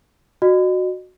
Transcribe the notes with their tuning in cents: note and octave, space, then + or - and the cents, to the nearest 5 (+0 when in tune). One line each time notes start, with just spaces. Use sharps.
F#4 -10 D#5 -35